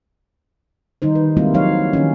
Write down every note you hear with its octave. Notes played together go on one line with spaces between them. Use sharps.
D#3 G3 D#4 C5
B4
G3 G#3 A#3 C4 E4 F4
F3 F#3 D#4 C#5 F5
D#3 E3 C#4